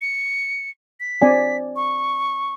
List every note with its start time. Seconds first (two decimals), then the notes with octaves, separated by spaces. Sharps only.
0.01 C#7
1.00 B6
1.22 C4 D5 G#5
1.76 C#6